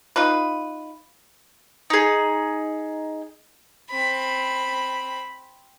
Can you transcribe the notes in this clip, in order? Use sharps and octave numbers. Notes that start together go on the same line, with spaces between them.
D#4 F4 B4
D#4 G#4
C4 B5